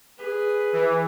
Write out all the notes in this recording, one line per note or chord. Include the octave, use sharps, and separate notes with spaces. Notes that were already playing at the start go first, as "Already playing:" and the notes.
G#4 B4
E3